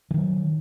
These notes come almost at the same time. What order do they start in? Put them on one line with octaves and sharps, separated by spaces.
E3 D#3 F#3